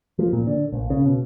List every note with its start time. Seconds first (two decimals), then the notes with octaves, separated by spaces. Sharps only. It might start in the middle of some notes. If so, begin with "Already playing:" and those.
0.19 F3
0.33 A#2
0.47 D3
0.72 A#1
0.90 C#3
1.05 B2